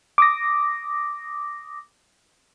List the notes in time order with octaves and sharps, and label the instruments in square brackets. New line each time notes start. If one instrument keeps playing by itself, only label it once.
[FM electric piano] D6 D#6 A#6